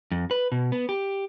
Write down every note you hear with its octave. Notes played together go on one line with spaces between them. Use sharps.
F2
B4
B2
B3
G4